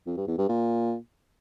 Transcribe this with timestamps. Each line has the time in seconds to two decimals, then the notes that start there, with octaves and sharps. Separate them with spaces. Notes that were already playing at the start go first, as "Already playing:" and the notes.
0.06 F2
0.17 G2
0.28 E2
0.38 G2
0.49 A#2